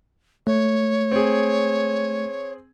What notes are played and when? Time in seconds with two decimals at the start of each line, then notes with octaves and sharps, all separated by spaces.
0.47 A3 C#5
1.12 C4 G#4